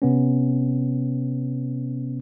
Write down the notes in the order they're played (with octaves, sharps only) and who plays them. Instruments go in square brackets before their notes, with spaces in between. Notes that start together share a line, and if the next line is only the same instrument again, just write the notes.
[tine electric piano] C3 B3 C#4